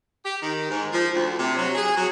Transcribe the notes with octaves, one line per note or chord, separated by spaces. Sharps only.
G4
D#3
G#2
F3
D2
C3
F#3
G#4
F#3